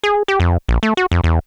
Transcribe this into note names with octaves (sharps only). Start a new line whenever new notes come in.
G#4
G4
F2
A#1
A3
F#4
F2
E2